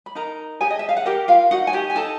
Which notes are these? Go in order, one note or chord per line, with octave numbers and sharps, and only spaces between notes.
B5
D#4 A#4 A#5
G4 G#4 G#5
D#5
E5
F5
F#5
G4 A#4 G5
F4 F5
D#4 F#4 F#5
G#5
G4 G5
G#5
D#4 A4 A5